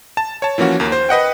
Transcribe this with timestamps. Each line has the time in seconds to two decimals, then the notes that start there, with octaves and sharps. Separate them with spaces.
0.17 A5
0.42 C#5 A5
0.58 E3 F3 A#3 C#4 F#4
0.80 D#2 A#3
0.92 C5
1.09 B4 D#5 F#5 G5